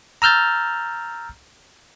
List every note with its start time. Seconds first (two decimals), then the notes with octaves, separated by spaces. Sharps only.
0.22 A#5 E6 F6 G6 A6